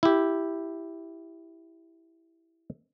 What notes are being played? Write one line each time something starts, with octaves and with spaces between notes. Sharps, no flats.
E4 G4